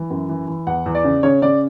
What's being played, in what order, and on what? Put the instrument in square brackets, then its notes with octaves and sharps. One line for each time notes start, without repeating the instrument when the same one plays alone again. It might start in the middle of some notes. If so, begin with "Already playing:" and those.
Already playing: [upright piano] E3
F#2
E3
E3
E2 F#5
E2
D5
C#3
C#3 C#5
C#3 D5